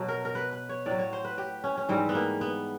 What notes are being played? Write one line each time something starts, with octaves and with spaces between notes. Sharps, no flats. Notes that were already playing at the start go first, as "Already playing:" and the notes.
Already playing: B2 F#3
A#4
A#4
B4
B4
C#5
A2 F#3 D5
C#5
C5
B4
G4
C#4
C#4
G#2 E3 G3 C4
B3
A#3
B3